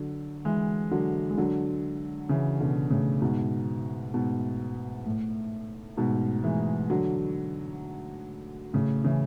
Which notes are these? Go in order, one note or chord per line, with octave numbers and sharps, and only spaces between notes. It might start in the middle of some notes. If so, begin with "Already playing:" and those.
Already playing: D3 F#3
E3 G#3
D3 F#3
G#3
D3 F#3
C#3 E3
B2 D3
A2 C#3
G#2 B2
G#2 B2
A2
G#2 B2
E3 G#3
D3 F#3
A2 C#3
C#3 E3